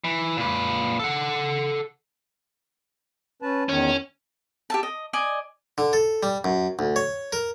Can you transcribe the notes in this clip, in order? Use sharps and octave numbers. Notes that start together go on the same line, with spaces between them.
E3
A#2 B4
A4 F#5
C#4 B4 A5
E2 D#3 C#4
G4 E5 A5
D#5
D5 D#5 G#5
D3
A4
G3
F#2
D2
C#5
A#4